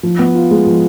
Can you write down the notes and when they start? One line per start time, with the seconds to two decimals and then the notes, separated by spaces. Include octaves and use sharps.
0.03 F3
0.19 B3
0.35 F4
0.51 G#3
0.67 F3